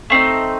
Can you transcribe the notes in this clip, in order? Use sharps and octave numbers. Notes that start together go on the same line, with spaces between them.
A3 C4 D#4